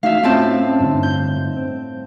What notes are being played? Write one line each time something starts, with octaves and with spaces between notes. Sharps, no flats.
A3 D#4 F#4 E5 F5
A2 C4 C#4 F4 D#5 A5
G2 D3 D#4
G6
C4